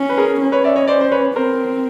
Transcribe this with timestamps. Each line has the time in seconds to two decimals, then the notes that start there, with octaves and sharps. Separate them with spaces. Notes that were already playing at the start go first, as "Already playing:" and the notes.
Already playing: C#4
0.09 B4
0.17 G#4 A#4
0.41 C#4
0.52 B4 C#5
0.64 D5 E5
0.76 C#5 D#5
0.88 C5 D5
1.01 C5
1.12 B4 C#5
1.35 C4 A#4 C5